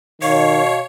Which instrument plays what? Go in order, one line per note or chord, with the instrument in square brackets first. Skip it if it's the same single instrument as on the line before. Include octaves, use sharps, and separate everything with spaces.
[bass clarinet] B2 [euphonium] D#3 [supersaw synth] C#5 [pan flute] F5